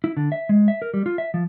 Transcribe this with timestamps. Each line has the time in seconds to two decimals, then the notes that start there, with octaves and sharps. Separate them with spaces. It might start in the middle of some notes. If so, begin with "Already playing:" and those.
0.04 E4
0.17 D3
0.32 E5
0.49 G#3
0.68 E5
0.82 A#4
0.94 G3
1.06 F4
1.18 E5
1.34 F3